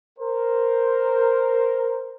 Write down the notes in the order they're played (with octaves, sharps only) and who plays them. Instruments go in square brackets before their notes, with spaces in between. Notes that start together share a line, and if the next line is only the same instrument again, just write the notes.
[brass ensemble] A#4 C5